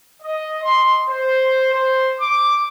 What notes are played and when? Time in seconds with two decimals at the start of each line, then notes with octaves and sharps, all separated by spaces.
0.22 D#5
0.63 C6
1.09 C5
1.73 C5
2.19 D6